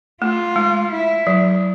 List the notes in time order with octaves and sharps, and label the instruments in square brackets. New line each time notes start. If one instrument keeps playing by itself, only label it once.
[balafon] A3 [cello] F4
[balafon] G#3
[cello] E4
[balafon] F#3